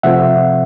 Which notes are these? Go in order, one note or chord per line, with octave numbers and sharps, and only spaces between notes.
C3 F3 A3 C4 F4 E5 F#5